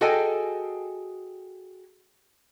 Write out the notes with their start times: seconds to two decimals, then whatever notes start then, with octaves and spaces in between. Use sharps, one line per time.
0.01 F#4 G#4 A4 D#5 G5 G#5